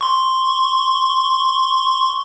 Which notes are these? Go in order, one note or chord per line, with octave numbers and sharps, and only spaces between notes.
C6 C#6